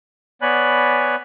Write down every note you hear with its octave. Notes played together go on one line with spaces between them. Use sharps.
B3 C#5 D5 G#5 B5 F#6